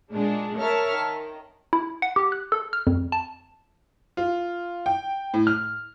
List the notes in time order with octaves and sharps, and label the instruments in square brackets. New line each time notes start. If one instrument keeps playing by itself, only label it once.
[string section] A#2 G#3 D4
A#4 C#5 E5 A5 F6
D#3
[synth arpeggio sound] E4
F#5
G4
F#6
A4
F6
F2
A5
[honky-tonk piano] F4
G5
A2
F6